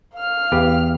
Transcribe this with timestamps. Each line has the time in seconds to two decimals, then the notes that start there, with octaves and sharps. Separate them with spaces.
0.16 F5 F6
0.52 E2 G4 B4